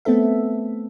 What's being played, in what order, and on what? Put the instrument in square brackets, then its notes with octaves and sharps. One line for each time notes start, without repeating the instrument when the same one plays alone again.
[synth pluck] A3 B3 C4 A4 E5